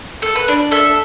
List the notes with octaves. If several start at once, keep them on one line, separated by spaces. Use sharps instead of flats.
A4
B4
D4 D5
A4 E5